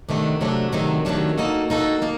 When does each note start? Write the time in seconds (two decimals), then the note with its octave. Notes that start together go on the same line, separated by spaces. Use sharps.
0.09 C3 D#3 F#3 A3 D4
0.41 C3 D#3 F#3 A3 D4
0.72 C3 D#3 F#3 A3 D4
1.05 C3 D#3 F#3 A3 D4
1.38 A#3 D#4 F#4 A4
1.70 A#3 D#4 F#4 A4
2.02 A#3 D#4